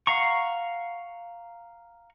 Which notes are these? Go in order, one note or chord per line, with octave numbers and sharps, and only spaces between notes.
F5 F#5 A#5 C#6